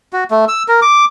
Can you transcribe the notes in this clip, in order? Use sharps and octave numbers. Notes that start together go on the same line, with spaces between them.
F#4
A3
E6
A#4
D6